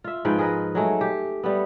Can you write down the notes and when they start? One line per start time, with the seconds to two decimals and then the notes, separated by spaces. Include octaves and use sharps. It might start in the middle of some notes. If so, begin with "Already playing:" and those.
0.04 F4 E5
0.25 G#2 F3 B4 G5
0.39 G#4 A#4 B4 D#5
0.75 F#3 G#3 A3
1.01 G4
1.43 G3 A3 B3